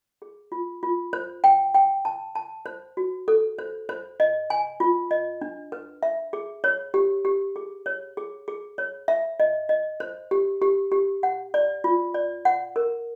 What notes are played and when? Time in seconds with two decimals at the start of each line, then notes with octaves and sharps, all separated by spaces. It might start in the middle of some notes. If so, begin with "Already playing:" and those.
0.22 G#4
0.52 F4
0.83 F4
1.13 C5
1.44 G5
1.74 G5
2.05 A5
2.35 A5
2.66 C5
2.97 F#4
3.28 A4
3.59 C5
3.89 C5
4.20 D#5
4.50 G#5
4.80 F4
5.11 D#5
5.41 D4
5.72 B4
6.03 E5
6.33 G#4
6.64 C#5
6.94 G4
7.25 G4
7.56 G#4
7.86 C#5
8.17 G#4
8.48 G#4
8.78 C#5
9.08 E5
9.40 D#5
9.69 D#5
10.00 C5
10.31 G4
10.62 G4
10.92 G4
11.23 F#5
11.54 D5
11.84 F4
12.14 D5
12.45 F#5
12.76 A#4